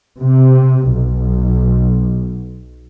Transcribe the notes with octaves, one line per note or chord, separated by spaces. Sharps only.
C3
B1